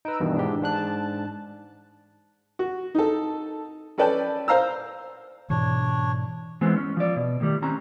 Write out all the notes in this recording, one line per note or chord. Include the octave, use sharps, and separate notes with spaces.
D#4 B4 A#5 E6 D7
G2 B2 D#3 E3 D4
G#2 G4
G#2 D4 A5 F#6
F#4
D#4 A4
C#4 A4 B4 D5 G5 A5
C5 F5 A#5 E6
G#2 B2 E3 D4 C#5
E3 G#3 B3 C4
C#4
F3 D5
B2
A2 D#3 G3
C4 C#4 A#5